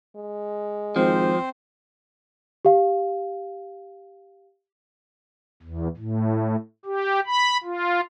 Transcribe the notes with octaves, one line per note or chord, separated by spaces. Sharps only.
G#3
G#1 F3 C4 C5
G4 F5
E2
A2
G4
B5
F4